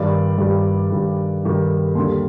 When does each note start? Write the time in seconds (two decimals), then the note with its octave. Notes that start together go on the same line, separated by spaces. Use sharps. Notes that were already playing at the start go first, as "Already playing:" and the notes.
Already playing: G2 D#3 G3 D5
0.38 G2 D#3 G3
0.90 G2 D#3 G3
1.43 G2 D#3 G3
1.95 D#2 D3 G3 A#3 C6